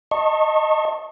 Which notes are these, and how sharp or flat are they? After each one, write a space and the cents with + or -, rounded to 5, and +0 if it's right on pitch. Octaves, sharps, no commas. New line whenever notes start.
D#5 +0 A5 +30 C#6 -30